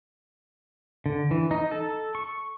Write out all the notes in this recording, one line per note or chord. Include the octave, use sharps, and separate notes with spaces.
D3
E3
D#4
A4
C#6